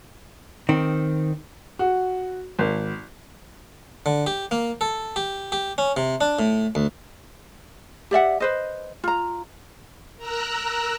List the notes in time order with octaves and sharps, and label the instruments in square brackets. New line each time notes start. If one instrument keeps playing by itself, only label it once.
[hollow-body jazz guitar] D#3 C4
[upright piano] F#4
G#1
[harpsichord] D3
G4
A#3
A4
G4
G4
C#4
C3
D4
A2
D2
[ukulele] G4 D5 E5 F#5
B4 C5 D#5
F4 A#5
[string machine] A#4 A#5 E6 F#6